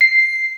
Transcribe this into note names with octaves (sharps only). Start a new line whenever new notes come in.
C7